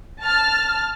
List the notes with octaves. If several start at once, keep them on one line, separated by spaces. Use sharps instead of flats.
A5 F6